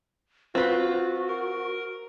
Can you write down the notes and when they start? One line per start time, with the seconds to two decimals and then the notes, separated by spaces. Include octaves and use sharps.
0.55 C4 F4 F#4 B4
1.29 A#4